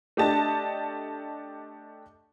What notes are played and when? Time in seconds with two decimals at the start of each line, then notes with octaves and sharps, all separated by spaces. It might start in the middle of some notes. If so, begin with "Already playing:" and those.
0.17 A3 D4 G4 D#5 A5